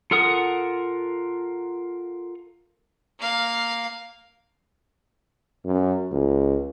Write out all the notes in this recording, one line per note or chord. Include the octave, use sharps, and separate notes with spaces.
F4 A4 A#4 F#5 D#6
A#3 F5
F#2
C#2